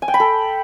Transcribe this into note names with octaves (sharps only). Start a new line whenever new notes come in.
G#5
G5
B5
A4